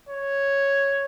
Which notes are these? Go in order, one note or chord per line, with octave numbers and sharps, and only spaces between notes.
C#5